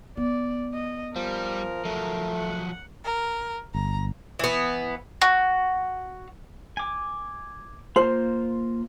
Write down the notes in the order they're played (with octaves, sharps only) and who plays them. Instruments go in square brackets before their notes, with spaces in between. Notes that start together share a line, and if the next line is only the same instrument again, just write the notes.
[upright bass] B3 [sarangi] D5
[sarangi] D#5
[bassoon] F3 [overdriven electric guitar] G3 [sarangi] A#4
[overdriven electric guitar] F3 F#3 [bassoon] A3
[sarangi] F#5
[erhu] A#4
[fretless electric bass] G1 [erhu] A#5
[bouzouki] E3 B3
[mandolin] F#4
[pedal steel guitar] G#5 D6
[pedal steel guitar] A#3 F4 [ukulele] C5